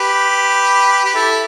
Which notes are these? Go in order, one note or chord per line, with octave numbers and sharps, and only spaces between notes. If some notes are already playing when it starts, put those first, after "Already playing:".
Already playing: G4 B4
G4
E4 A4